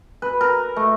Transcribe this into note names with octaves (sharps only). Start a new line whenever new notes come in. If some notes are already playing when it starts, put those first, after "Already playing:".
B4
A#4
A3